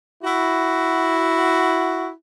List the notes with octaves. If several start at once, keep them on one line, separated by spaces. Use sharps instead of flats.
E4 F#4